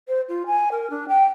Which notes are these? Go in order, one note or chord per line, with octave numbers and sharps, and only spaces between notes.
C5
F4
G#5
A#4
D4
G5